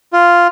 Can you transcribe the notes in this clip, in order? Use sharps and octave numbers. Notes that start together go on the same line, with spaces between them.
F4